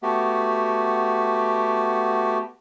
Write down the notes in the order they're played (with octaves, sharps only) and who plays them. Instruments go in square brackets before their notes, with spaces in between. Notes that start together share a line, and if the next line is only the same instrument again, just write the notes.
[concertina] A3 B3 F#4 G4